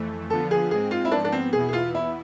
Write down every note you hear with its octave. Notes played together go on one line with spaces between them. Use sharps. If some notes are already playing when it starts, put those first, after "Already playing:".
Already playing: F2 E3 A3
D3 F3 B3 F4 A4
G#4
G#2 G#3 C4 G#4
F4
E4
G#2 F3 B3 D4
D4
C4
E2 B2 B3 E4 G#4
G#4
F4
E4